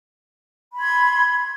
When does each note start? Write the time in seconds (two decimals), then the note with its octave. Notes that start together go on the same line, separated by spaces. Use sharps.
0.72 B5
0.76 C6
0.79 G#6